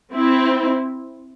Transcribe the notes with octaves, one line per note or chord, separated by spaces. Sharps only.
C4 E4